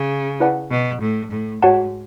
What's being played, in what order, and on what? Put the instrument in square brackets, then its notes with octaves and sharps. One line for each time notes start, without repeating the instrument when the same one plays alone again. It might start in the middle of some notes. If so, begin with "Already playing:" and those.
Already playing: [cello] C#3
[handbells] E4 B4 D5 F#5 A5
[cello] B2
A2
A2
[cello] G#2 [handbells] F#4 C#5 F#5 A5